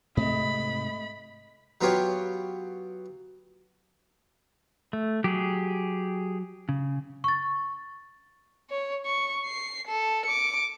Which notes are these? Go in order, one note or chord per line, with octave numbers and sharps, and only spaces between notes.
G#2 C3 A3 C4 D#5 B5
F#3 B3 F4 G4 C#5
A3
F#3 G4 G#4
C#3
C#6 A6
C#5
C#6
C7
A4
D6 C#7